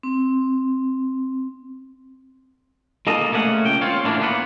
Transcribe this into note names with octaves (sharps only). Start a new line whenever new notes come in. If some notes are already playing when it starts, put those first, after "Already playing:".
C4
G#3 A#3 A4 D#5
A3 A#3 C#4 D#5 F#5
C#2 G5
C4 F4 C#5 F5
A2 D3 E3 A#3 D4
A#3 B3 F#5